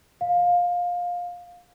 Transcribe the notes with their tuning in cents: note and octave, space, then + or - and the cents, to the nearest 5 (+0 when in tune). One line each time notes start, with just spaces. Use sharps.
F5 +20